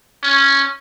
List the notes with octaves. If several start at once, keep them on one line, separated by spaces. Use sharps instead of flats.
C#4